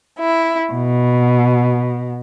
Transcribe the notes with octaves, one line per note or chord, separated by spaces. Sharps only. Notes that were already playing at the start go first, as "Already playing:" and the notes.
E4
B2